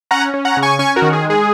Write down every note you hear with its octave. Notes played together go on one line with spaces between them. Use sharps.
C#4 F#5 A#5
C#4
F#5 A#5
C#3
G#5 C#6
C#4 G#5 C#6
F#4 A#4
D#3
G#4
G#3
G#4